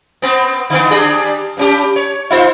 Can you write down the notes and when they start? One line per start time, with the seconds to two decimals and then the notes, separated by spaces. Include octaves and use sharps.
0.22 B3 C4
0.70 D3 D#3 B3
0.91 G3 D4 G#4
1.57 G2 C#4 G4
1.96 C#5
2.30 D#4 F4 C5